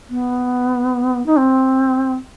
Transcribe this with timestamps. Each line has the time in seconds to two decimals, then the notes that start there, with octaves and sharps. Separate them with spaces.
0.10 B3
1.26 D#4
1.38 C4